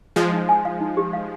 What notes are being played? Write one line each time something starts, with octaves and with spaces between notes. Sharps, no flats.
F3 G#3 D#5
D#4
G#5
F5
D#4
G4
F5